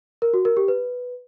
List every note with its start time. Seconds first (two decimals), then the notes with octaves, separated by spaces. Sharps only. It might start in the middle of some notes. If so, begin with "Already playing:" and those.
0.22 A#4
0.34 F#4
0.45 A#4
0.57 G4
0.68 B4